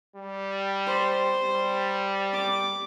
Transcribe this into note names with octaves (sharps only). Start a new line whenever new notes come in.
G3
C5
G3
D6